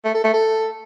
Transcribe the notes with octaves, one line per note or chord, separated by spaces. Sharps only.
A3
A4
A3
A4